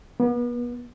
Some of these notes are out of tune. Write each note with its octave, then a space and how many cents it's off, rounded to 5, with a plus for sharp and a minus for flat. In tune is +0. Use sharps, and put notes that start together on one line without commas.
B3 -35